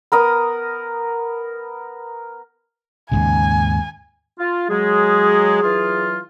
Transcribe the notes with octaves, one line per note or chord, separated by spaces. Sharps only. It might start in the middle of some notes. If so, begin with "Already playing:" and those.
B3 A#4 D#6
D#2 G#2 C#3 G#5
F4
F#3 G#3 G#4
E3 F#3 F4